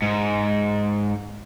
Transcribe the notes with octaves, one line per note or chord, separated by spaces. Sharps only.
G#2